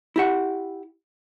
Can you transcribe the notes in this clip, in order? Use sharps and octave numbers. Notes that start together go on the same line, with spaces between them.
E4 G4 F#5